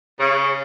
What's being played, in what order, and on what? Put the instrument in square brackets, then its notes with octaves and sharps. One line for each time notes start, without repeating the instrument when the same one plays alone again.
[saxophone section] C#3